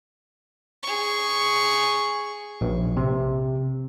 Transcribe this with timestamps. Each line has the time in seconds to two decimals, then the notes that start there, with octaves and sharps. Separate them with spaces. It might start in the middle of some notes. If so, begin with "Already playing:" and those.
0.83 G#4 C#6
2.61 A#1
2.97 C3